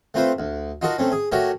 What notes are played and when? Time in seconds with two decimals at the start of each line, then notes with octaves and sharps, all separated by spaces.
0.14 A3 C4 F4 B4 C5
0.39 D2
0.82 D#4 F4 F#4 A4 A#4
0.98 A3 C4 C#4
1.12 G#4
1.32 A3 F#4 G4 A#4 C#5